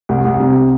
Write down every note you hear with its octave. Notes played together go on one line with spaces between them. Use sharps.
C2
C2
C3